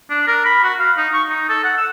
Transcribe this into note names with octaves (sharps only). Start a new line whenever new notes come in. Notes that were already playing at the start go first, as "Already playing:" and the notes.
D4
A#4
B5
F#4
F5
D#4
C#6
D#4
A4
F#5
E6